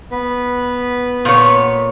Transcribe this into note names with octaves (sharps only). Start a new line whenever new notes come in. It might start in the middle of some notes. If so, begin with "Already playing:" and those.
B3 B4
A#2 C#5